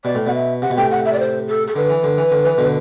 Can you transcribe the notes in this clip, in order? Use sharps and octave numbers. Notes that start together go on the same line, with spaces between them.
B2 D5
A2
B2 F#5
E5
C3 F#5
B2
A2 C3 G5
F#5
E5
D5
C5
A4
A4
D3 B4
E3
D3
E3
D3
E3
B2 D3